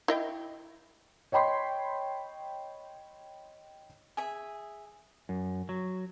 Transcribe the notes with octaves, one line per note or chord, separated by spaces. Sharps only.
E4 D#5 G5
C#5 D#5 G5 B5 C6
G#4 E5
F#2
F#3